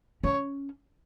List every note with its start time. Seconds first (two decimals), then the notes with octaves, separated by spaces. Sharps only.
0.24 C#4 C#5